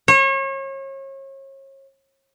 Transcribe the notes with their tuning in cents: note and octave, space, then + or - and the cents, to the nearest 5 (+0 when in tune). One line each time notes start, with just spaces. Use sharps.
C#5 -35